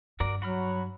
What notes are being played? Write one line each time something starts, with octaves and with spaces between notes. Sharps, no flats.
G2 F#4 A#4 D5
F#3 F#4 B5 F6